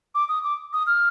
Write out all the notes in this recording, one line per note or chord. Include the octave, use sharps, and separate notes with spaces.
D6
D#6
D6
D#6
F6